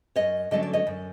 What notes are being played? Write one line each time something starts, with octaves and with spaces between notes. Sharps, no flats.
F#2 C#5 D#5
D3 F#3 A3 C#4 D#5
D5
C#5 D#5
F#2